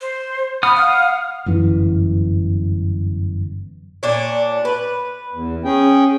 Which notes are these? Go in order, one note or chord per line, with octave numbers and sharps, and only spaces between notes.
C5
F#5 B5 D#6 F6
F5
G1 F#2 E3
A#2 D4 C#5
B4
E2
C#4 G#4 G5